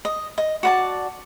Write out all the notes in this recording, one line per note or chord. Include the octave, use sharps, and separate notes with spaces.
D#5
D#5
F#4 D5 A5